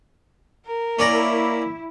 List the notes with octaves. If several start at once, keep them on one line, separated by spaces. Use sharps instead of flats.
A#4
A#3 C#4 E4 D5 A#5